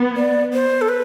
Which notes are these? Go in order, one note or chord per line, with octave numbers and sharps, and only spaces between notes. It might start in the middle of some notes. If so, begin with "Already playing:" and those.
Already playing: B3
D5
C5
A4
B4